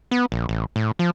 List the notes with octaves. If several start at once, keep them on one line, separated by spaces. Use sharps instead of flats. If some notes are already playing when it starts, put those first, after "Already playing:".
B3
A#1
A1
A2
F3